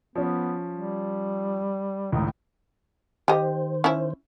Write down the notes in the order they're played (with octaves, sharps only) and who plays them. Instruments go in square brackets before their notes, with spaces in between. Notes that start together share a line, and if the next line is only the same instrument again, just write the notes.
[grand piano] F3 C#4 [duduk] B3
[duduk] G3
[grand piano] G#1 C#2 A2 [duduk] D#4
[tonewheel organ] D#3 C5 [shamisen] G4 D#5
[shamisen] C#4 E4